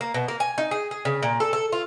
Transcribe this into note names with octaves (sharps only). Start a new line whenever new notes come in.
A#3
B2
A#3
G#5
D#4
G#4
G#4
C#3
A#2
A4
A4
F4